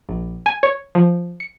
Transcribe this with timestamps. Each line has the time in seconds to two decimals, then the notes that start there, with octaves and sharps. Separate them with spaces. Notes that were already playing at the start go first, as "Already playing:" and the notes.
0.09 A#1
0.46 G#5
0.63 C#5
0.95 F3
1.40 C#7